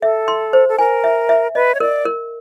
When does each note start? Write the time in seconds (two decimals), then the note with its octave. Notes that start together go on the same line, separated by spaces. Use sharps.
0.02 A4 E5
0.28 C6
0.53 C5
0.69 A4
0.79 A#4 G#5
1.04 E5
1.29 E5
1.55 B4 D#5
1.75 C#5
1.80 A#4 D5
2.05 A#4